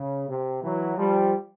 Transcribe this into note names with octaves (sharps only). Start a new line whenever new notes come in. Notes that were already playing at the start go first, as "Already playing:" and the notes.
Already playing: C#3
C3
E3 F#3
F3 G3